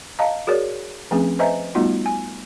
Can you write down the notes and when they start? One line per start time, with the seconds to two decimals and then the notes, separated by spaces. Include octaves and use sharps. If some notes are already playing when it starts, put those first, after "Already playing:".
0.19 D#5 F5 A5 A#5
0.47 F#4 G#4 A#4 C#5 D5
1.11 F3 A3 C4 C#4 G#4
1.39 B4 C5 D#5 E5 G#5 A#5
1.75 G3 A3 B3 D#4 F4 F#4
2.06 G#5